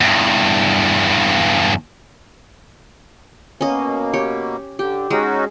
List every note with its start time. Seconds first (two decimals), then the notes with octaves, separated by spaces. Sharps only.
0.01 E2 G2
3.61 B2 A#3 C#4 D#5
4.14 G4 C#5
4.79 D3 G4
5.10 G#3 C#4 D#4 F#4